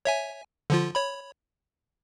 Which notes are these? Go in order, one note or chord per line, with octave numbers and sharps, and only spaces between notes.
C#5 E5 G#5
D3 F3 F4
C#5 B5